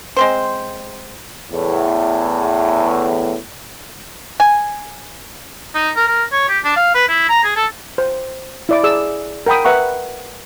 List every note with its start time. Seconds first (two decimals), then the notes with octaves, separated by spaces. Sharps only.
0.17 G#3 C4 C5
1.52 E2 A2
4.40 G#5
5.75 D#4
5.96 A#4
6.07 A#4
6.32 C#5
6.49 G4
6.64 D4
6.76 F5
6.94 B4
7.08 E4
7.29 A#5
7.44 G#4
7.56 A4
7.98 C5
8.69 E4 D5 D6
8.84 G#4 D5 E6
9.46 A#4 F#5 G5 B5 D#6
9.65 B4 E5 F#5 A#5 C#6